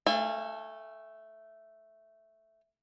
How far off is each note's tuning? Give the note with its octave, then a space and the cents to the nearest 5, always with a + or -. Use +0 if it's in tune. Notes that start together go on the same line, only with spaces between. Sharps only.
A3 +0 F5 -30 G#5 -35